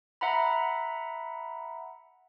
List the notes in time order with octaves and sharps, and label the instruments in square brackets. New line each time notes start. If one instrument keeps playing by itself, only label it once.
[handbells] E5 F#5 A#5 B5